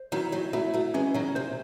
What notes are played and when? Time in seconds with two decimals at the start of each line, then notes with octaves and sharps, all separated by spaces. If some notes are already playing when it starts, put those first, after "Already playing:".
Already playing: C5
0.12 D#3 F#3 E4
0.32 D#3 F#3
0.53 F#3 A3 E4
0.74 F#3 A3
0.94 E3 G#3 C#4
1.14 D#3 F#3
1.35 C3 C5